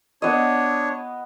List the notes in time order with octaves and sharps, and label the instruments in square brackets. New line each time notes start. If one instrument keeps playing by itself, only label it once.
[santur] B3 D#5 [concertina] D4 C#5